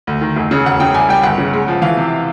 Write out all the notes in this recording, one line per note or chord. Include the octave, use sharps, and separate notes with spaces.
D2
D#3
F1
C#3
E1 F#5
C#3 G5
C2 G#5
G3 G5
G1 F#5
C#3
G#3
F3
E3 F5
C3